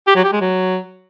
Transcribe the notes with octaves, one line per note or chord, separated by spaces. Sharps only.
G4
F#3
G4
G#3
F#3